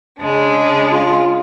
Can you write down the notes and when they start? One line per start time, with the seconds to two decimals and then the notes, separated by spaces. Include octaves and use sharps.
0.18 C#3 G#3 D4
0.90 F4